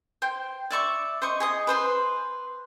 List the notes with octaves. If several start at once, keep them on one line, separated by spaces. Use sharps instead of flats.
C5 G5
D5 E5 C#6 D6
C5 D#5 C#6
G#4 D#5 D#6
B4 C5 C6